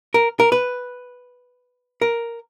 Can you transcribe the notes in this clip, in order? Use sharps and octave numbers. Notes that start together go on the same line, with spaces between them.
A#4
A#4
B4
A#4